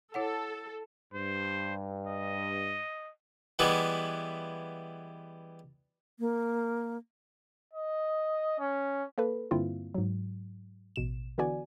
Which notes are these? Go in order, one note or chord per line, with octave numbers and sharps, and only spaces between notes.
E4 A4 C#5 F#5
G2 C5
D#5
E3 G3 G#3 B3 E4
A#3
D#5
C#4
A#3 A4 B4
G2 D3 A#3 C4 E4 F4
G#2 F#3
A1 B2 E7
D3 E3 B3 F#4 D5 G#5